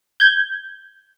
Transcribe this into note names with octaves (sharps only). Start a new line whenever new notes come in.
G6 G#6